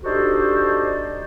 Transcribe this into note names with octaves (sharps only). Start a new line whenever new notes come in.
D4 D#4 F#4 G4 A4 C5